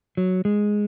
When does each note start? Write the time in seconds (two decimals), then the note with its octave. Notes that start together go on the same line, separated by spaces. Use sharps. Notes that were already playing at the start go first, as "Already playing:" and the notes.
0.17 F#3
0.45 G#3